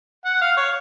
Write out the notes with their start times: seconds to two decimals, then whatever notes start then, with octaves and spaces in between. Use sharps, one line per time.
0.25 F#5
0.41 F5
0.57 C#5